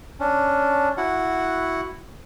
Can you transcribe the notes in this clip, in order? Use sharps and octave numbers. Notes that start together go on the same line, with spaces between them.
C#4 D4
E4 F#4 F#5